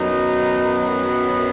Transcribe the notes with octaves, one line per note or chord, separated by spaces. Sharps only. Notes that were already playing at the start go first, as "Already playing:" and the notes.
Already playing: F#2 D#3 F#3 B3 D#4